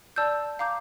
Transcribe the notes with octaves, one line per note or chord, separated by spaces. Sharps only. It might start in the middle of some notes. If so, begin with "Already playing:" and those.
D5 A5 E6 G6
F5 A#5 D6 G6